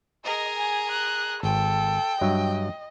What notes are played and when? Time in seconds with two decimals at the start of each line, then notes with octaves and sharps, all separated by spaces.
0.24 G#4 A#4 D#5
0.56 G#5
0.91 F#6
1.43 G#1 A4 G5
2.21 G2 F#3 D#5 E5